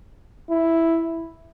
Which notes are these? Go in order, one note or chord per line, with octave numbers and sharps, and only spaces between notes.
E4